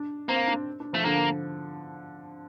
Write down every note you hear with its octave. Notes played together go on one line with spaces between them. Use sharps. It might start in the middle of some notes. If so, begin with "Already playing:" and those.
Already playing: D4
A#3 C4
D4
D4
F3 A3
D3 A#3